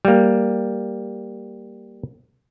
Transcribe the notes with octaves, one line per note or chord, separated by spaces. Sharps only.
G3 A#3